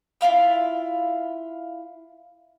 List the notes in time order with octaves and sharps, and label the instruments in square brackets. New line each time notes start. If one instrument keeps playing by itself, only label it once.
[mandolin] E4 F4 F5 B5